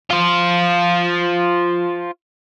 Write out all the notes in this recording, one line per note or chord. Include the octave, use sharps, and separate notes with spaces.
F4 C5